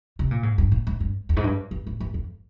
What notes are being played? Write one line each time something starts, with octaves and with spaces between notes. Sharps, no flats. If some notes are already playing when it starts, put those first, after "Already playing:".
C3
A#2
G#2
G2
A#2
G#2
G2
F2
G#2
G2
G2
G#2
G2
F2